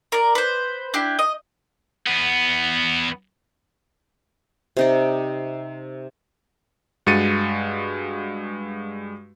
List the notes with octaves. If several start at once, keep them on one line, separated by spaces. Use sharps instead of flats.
A#4 D5
B4 C5
D4 E4 G4
D#5
E2 B3
C3 D#4 D5
G2 G#3 F#4 A6 C#7 D#7